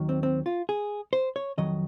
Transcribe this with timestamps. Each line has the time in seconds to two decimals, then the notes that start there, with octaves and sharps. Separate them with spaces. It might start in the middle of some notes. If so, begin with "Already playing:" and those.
Already playing: D#2 D#3 F#3
0.09 C4
0.23 C4
0.46 F4
0.69 G#4
1.13 C5
1.36 C#5
1.58 F2 D#3 F#3 D#5